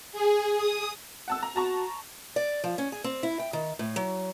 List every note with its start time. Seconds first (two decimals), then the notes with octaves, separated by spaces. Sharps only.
0.12 G#4
0.56 D#6
1.28 F#5 A5 E6
1.43 A#5
1.56 F#4 A5 A#5 C#6
2.36 D5
2.64 F3
2.78 C#4
2.92 G#4
3.04 C4
3.23 E4
3.40 G5
3.53 D#3
3.79 A2
3.96 F#3